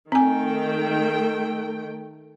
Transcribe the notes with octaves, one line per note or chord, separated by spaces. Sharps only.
D#3 A3 C4 G5 G#5